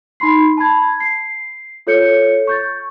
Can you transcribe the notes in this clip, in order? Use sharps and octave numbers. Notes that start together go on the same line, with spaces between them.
D#4 B5 C6 C7
A5 B5 G#6
C7
F4 A4 C#5 G6 C#7
C#6 G6 A6